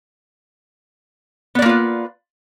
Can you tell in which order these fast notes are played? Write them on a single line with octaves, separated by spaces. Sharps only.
B3 D5 A#3 F4 B4